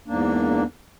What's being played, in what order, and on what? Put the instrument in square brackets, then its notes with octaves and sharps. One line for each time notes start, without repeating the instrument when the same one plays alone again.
[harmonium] E2 G#2 A#3 D4